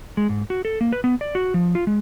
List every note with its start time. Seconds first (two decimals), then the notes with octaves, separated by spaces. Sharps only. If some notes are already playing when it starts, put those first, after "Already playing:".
0.17 G#3
0.29 G#2
0.50 F#4
0.65 A4
0.81 A#3
0.92 B4
1.04 B3
1.21 D5
1.35 F#4
1.54 F3
1.75 F4
1.87 G#3